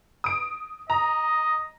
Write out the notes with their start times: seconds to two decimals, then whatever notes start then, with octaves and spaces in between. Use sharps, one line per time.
0.24 D#6 D7
0.90 D#5 A#5